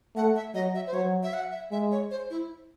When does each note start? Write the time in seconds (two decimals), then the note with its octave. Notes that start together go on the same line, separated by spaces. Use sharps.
0.16 A3 F#5
0.36 E5
0.54 F#3 D#5
0.75 E5
0.87 C5
0.93 F#3 C#5
1.23 E5
1.33 F#5
1.52 E5
1.72 G#3 E5
1.92 C#5
2.11 C5
2.30 E4